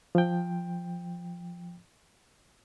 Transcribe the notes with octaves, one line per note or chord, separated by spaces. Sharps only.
F3 G5